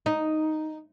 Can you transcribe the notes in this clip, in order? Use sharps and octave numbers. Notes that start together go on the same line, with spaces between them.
D#4